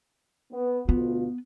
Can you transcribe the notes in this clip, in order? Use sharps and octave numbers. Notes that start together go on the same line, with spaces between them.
B3
D2 B2 B3 F4